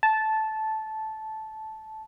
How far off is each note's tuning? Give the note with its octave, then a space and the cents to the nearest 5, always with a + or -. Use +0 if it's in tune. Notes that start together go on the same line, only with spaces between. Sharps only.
A5 -10